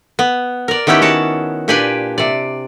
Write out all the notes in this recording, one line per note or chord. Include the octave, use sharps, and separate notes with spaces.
B3
A#4 D5
D#3 B3 C#4 E4 G4 G5
F#4 C#5 A5
A#2 D4 G4 B4 D5 G#5
C3 D5